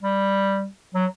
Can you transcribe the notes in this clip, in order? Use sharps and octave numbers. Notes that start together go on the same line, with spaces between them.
G3
F#3